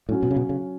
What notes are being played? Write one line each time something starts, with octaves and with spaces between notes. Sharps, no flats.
A2 F#3 C#4 F#4
B2
C#3
B2
C#3